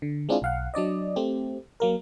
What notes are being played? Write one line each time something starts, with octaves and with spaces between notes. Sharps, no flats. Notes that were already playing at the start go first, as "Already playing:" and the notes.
D3
G#3 C4 D4 E4 F4 G#4
B1 F5 F#5
F#3 D4 D5 D#5
A3 C4 G4
F#3 A#3 A#4